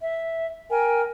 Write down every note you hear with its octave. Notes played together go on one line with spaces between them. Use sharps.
E5
A#4 G5 G#5